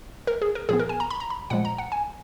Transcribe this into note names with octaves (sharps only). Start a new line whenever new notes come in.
A#4
G#4
A#4
A#2 F3 B3 G#4
A#4
G#5
A#5
B5
A#5
B5
A#2 F3 G#3 F#5
A#5
F#5
G#5